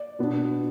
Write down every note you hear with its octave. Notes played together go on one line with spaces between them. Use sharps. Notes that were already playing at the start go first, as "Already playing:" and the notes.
Already playing: D5
B2 B3 D4